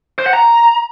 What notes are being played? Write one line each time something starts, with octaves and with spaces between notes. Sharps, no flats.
C5
F#5
A#5